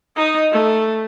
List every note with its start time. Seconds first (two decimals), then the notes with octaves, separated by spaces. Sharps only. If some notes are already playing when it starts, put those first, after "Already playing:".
0.17 D#4 D#5
0.52 A3